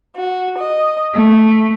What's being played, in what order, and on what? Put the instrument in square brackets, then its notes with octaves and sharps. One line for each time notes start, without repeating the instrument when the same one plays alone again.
[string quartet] F#4
D#5
A3